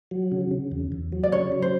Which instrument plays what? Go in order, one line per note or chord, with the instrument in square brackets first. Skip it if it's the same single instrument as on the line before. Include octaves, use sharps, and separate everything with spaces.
[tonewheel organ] F#3
C#3
C#3
E2
E2
F#3
[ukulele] D5
[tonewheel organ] C#3 [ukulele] C#5
[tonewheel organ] F#3
[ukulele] C5